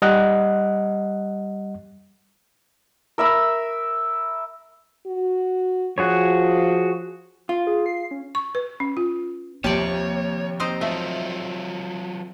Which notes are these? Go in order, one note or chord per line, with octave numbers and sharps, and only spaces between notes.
G3 D#5 F#5 F#6
A#4 E5 B5 E6
F#4
F3 F#4 G#4 C#5
F4 F5
G#4
C7
C#4
C#6
B4
C#4
F4
D#2 C3 F3 G4 C#5 D5 A5 D#7
C4 D#4 C5
F#3 A3 F4 E5